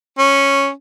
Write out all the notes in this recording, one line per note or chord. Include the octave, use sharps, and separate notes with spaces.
C#4